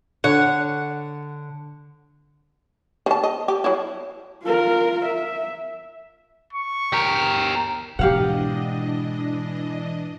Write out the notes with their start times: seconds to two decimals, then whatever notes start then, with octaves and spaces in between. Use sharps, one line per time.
0.24 D3 C#5 F#5
3.06 D#3 A5
3.24 D#5
3.48 G4
3.64 F#3 E4
4.44 F4 A#4
5.05 E5
6.53 C#6
6.93 G4 A#4
7.99 G#2 B2 E3 D4 G4 D#5 F5 F#5